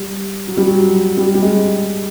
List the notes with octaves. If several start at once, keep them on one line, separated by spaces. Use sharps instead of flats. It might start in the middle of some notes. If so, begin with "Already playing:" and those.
Already playing: G3
F#3
G3
F#3
G3
G3
G#3